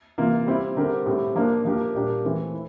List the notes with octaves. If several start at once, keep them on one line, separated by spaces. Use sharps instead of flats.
C3 E3 A#3 F4
G3 C4 E4
D3 G3 C4 G4 A#4
A2 G3 C4 G4
F3 A#3 D4 F4 A#4
F3 A#3 D4 G4 A#4
A#2 G3 D4 G4 A#4
E3 A3 C4
E4